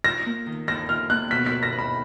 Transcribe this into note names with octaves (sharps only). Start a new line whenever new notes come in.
F4 A#6
A#3
D#3
D#2 A#6
F4 F6
A#3 F#6
B2 B6
B6
B4
A#6
B4
B5